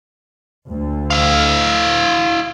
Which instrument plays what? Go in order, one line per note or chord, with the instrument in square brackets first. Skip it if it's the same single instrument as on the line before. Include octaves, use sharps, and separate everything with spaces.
[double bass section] D2
[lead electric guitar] E4 F5